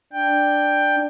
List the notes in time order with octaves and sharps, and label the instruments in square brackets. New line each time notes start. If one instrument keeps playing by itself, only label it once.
[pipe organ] D4 G5